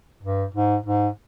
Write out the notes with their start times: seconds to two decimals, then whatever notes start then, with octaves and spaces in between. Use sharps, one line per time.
0.23 G2
0.54 G#2
0.86 G#2